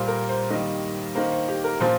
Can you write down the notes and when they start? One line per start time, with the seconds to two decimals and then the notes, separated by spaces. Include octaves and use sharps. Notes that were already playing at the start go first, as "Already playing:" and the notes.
Already playing: A#2 G3 A#3 C5
0.08 A#4
0.29 C5
0.50 D#3 G3 A#3 D#5
1.15 D#3 A#3 C5
1.32 C5
1.48 G4
1.64 A#4
1.80 A#2 F3 C5